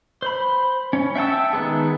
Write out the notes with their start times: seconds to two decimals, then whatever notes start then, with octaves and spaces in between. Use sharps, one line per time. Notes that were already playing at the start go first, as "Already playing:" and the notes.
0.22 C5 B5
0.93 C#4
1.15 E5 F#5 G5 A5 E6
1.53 D#3 G#3 B3 G#4